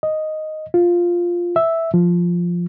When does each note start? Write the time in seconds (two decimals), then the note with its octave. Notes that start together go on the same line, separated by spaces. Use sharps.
0.03 D#5
0.74 F4
1.56 E5
1.94 F3